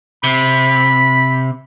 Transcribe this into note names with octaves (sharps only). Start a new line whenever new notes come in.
C3 B5